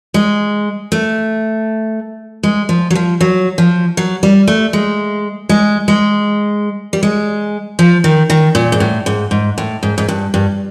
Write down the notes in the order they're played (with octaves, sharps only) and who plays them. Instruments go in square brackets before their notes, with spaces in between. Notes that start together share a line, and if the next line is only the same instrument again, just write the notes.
[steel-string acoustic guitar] G#3
A3
G#3
F3
F#3
F3
F#3
F3
F#3
G3
A3
G#3
G#3
G#3
G3
G#3
F3
D#3
D#3
A#2
G#2
A2
G#2
G#2
A2
G#2
G#2
G2
G2